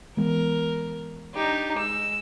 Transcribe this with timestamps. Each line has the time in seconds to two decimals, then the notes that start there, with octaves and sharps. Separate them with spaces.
0.17 E3 G#3 B3 A#4
1.35 D4 D#4 G4
1.75 G#3 E6